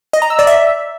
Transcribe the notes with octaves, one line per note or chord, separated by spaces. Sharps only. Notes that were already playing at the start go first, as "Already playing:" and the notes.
D#5
A#5
E6
D5
E5